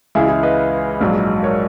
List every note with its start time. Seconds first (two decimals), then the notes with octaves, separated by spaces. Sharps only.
0.15 C#2 C#3 E3 G#3 E4 G#4
0.28 E4 G#4
0.43 B4 D#5
1.01 A#1 G#2 F#3
1.43 A#4 C#5